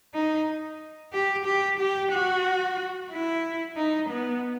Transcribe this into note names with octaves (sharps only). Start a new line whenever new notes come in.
D#4
G4
G4
G4
F#4
E4
D#4
B3